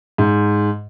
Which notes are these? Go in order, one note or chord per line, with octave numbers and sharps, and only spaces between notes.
G#2